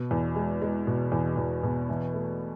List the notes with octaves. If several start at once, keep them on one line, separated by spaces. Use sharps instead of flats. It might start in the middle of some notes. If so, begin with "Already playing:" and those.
Already playing: B2
E2
G#3
G#3
B2
E2
E2
B2
E3
A3